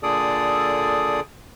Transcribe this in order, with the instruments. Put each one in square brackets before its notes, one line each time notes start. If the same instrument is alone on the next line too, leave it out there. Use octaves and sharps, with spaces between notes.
[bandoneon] A#2 D3 G#4 A4 D5 D#6